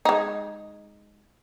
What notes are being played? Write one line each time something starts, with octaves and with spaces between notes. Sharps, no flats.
G#3 D#4